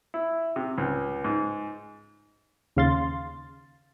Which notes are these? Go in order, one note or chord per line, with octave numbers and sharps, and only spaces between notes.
E4
C3
C#2
G#2
D#2 C#3 F5 C6 A6